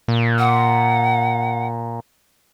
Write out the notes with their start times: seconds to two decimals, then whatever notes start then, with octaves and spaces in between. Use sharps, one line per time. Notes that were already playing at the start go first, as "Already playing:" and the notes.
0.08 A#2
0.39 F#5